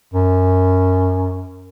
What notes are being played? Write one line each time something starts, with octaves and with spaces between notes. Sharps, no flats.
F#2